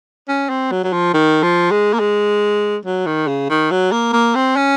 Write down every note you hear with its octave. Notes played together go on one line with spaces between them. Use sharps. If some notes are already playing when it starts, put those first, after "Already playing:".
C#4
C4
F#3
F#3
F3
D#3
F3
G#3
A#3
G#3
F#3
D#3
C#3
D#3
F#3
A#3
A#3
C4
C#4